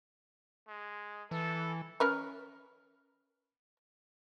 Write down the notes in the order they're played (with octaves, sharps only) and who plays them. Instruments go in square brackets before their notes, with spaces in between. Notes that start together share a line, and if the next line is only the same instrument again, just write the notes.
[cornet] G#3
[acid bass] E3 [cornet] A4
[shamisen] C#4 A#4 B4